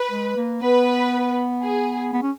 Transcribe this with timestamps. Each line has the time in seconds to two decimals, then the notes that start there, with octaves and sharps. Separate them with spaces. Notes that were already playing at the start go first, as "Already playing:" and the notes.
Already playing: B4
0.11 G#3
0.36 A#3
0.62 B3 B4
1.63 G#4
2.13 B3
2.22 C#4